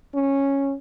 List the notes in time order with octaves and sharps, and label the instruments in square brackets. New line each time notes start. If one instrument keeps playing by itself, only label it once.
[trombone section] C#4